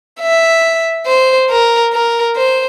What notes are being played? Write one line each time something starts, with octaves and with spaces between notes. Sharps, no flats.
E5
C5
A#4
A#4
C5